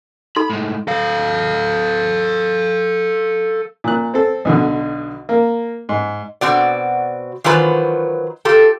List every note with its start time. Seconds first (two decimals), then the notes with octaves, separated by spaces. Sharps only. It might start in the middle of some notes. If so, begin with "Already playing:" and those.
0.36 D#4 A4 B5 C6
0.50 A2 G#3
0.88 A4 F5
3.84 A#2 F#6
4.14 C4 A4
4.45 B1 B2 D3
5.29 A#3
5.89 G#2
6.41 B2 C4 F#4 D5
7.44 D#3 E3 F#3 F4 B4 C5
8.45 F4 G4 A4